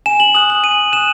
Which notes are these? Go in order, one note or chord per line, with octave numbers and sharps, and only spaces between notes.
G#5 E7
F#7
D#6 F#6 F#7
F#7
G#5 D#7
D#6 F#6 E7